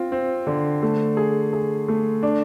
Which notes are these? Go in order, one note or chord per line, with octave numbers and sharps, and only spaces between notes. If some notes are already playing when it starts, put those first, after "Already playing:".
Already playing: C4 F4
C4
D3
A3
G#4
G#4
A3
D4